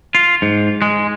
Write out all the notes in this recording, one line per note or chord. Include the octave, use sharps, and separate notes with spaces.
F4
G#2
G#3